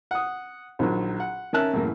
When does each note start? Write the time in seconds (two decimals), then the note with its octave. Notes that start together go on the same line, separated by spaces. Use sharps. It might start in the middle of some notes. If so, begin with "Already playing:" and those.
0.11 F#5 D#6
0.79 A#1 D#3 F#3
1.20 F#5
1.53 D#3 C#4 A#4 E5 A5 F#6
1.73 F#2 A2 C#3 E3 A#3